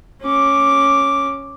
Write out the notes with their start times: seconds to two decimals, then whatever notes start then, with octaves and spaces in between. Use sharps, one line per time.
0.22 C#4 D6